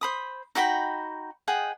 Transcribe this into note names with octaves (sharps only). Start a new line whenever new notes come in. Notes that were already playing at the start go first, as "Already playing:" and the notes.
C5 B5 D#6
D#4 F#4 G5 B5
G#4 D#5 F#5 G5